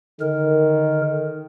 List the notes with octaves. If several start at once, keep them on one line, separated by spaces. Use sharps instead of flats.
D3 D#3 A#4